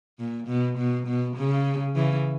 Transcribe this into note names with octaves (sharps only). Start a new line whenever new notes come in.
A#2
B2
B2
B2
C#3
C#3 E3